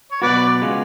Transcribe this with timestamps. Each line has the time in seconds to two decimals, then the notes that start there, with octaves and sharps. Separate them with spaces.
0.11 C#5
0.22 B2 F#3 B3 F#4 B4 D5
0.62 C#3 G#3 B3 F4